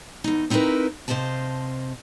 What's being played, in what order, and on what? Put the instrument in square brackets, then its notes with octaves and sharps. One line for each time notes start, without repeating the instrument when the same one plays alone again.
[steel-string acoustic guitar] E2 D#4
C4 D#4 E4 F#4 A#4 B4
C3 C5 D#5 F5 A5